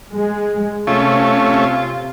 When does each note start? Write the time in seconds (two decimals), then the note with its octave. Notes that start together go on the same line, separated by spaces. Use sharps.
0.11 G#3
0.87 C3 A3 C#4 F4